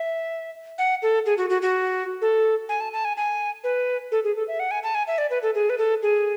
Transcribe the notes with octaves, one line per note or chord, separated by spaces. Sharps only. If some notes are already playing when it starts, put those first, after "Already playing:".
Already playing: E5
F#5
A4
G#4
F#4
F#4
F#4
A4
G#5
A5
A5
G#5
G#5
B4
A4
G#4
A4
E5
F#5
G#5
A5
G#5
E5
D5
B4
A4
G#4
B4
A4
G#4